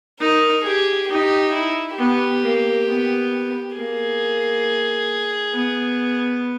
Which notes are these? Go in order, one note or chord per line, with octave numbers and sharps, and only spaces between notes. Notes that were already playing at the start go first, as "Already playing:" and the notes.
D#4 A#4
G4 G#4
D#4 G4
E4
B3 G4
A#3
B3
A#3 G#4
B3